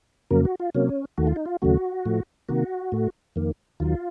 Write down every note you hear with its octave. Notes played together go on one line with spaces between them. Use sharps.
F2 C#3 F#3 A#3 A#4
F#4
F4
C3 F#3 A#3 C#4
D#2 D#3 A3 F#4
F4
D#4
F4
D#2 C#3 F#3 A3 F#4
A2 F3 A3
C3 D#3 A#3 F#4
A2 A3
F2 D#3 A#3
D#2 D#3 F#3 F4